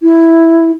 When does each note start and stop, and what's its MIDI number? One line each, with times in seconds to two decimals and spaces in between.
0.02 0.71 64